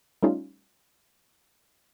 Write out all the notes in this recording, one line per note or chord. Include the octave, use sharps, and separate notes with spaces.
G3 A3 C#4 D#4 F4